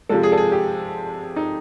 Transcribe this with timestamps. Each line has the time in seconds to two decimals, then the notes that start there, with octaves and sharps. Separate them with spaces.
0.09 C3 F3 G#3 A4
0.23 G#4
0.32 A4
0.38 G#4
0.52 G4
1.36 D#4